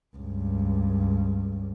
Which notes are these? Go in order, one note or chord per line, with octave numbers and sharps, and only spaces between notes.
C#2 G2